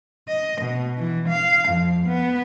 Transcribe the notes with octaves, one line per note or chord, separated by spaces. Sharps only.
D#5
B2
E3
F5
F2
B3